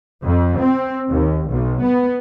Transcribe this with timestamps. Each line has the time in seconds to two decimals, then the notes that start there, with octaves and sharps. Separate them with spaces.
0.23 F2
0.58 C4
1.10 D#2
1.49 B1
1.82 B3